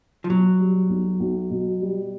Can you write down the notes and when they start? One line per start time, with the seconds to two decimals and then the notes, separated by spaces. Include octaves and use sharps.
0.24 F3
0.29 B2 F#3
0.60 G3
0.89 B1
1.20 B1
1.51 B2
1.82 G3